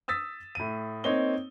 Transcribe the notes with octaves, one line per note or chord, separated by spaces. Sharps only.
D#6 E6 A6 B6
A2 D#7
A#3 C4 D#4 C#5 D#5 G7